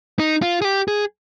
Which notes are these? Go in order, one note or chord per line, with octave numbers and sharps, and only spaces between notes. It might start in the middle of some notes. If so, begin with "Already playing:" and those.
D#4
F4
G#4
G4
G#4